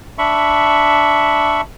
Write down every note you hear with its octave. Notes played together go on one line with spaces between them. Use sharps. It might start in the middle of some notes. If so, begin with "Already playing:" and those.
D4 E5 B5 C#6